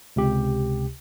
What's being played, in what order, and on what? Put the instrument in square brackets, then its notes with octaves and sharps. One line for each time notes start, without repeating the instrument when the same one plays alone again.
[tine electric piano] C#2 C3 G4